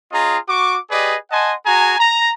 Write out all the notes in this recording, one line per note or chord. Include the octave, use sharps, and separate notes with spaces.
C#4 F4 G#4 D#5 A#5
F#4 C#6 D6
G4 G#4 B4 D5 D#5
D#5 F#5 G#5 A5 C6
F#4 G#4 G#5 A#5
A#5